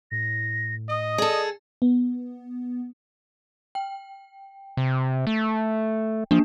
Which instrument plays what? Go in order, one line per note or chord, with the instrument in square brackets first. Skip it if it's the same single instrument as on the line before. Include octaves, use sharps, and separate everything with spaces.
[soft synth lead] A2 [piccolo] A#6
[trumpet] D#5 [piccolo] D#6
[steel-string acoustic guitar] G#4 A4 [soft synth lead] D5
[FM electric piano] B3
[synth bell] G5
[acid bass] C3
A3
[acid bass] F3 [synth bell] A#3 D4